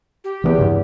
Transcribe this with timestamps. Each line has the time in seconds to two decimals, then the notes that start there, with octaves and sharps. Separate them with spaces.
0.24 G4
0.44 E2 E3 G#3 B3
0.58 G2 C#3